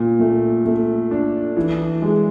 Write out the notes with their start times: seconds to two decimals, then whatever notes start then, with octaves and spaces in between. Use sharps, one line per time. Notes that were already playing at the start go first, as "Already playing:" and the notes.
Already playing: A#2
0.19 A3
0.65 A3
1.11 D4
1.57 E3
2.02 G#3